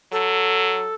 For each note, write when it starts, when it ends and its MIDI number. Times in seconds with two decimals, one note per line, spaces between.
0.12 0.89 54
0.12 0.95 69